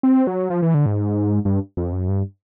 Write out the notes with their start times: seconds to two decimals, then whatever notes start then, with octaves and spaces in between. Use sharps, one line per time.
0.03 C4
0.27 F#3
0.50 F3
0.62 E3
0.74 D3
0.86 G#2
1.45 G2
1.77 F2
1.93 F#2
2.09 G2